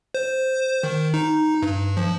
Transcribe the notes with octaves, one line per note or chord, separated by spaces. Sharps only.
C5
D#3
D#4
G2
F3